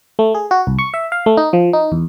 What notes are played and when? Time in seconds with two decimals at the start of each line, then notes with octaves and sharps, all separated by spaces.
0.19 A3
0.35 G#4
0.51 F#4
0.67 C2
0.79 C#6
0.94 E5
1.12 F5
1.26 A3
1.37 D#4
1.53 F3
1.73 D#4
1.92 E2